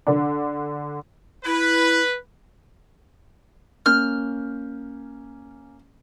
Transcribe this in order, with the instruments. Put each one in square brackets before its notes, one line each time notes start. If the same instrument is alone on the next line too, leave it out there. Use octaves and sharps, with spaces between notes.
[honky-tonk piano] D3 D4
[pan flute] E4 [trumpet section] B4
[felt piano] A#3 C#4 G6 [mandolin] F6